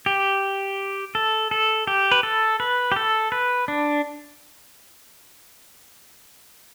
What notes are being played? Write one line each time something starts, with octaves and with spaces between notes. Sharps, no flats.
G4
A4
A4
G4
B4
A4
B4
G4
A4
B4
D4